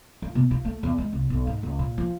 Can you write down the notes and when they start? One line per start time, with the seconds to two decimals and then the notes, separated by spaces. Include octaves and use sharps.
0.22 F4
0.35 B2
0.51 F4
0.65 A3
0.83 E2
0.98 G#3
1.13 C2
1.30 B1
1.47 G#2
1.63 C#2
1.79 A#2
1.98 F3